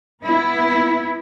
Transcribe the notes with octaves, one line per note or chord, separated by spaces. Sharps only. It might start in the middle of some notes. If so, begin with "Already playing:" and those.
B3 E4